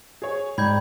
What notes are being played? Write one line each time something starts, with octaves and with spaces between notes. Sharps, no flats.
G#4 C#5
G#2 G3 G#3 A#5 B5 G6 G#6